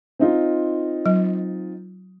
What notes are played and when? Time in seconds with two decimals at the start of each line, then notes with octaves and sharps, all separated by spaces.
0.19 C4 D#4 F4
1.06 F#3